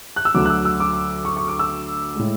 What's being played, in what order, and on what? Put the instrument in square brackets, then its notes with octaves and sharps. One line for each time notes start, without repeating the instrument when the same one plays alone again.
[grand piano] F#6
E6
D2 D3 F#3 D6
F#6
E6
E6
D6
C#6
C#6
D6
E6
A2 G#3